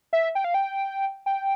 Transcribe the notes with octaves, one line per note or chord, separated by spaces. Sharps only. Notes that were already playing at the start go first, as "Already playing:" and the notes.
E5
G5
F5
G5
G5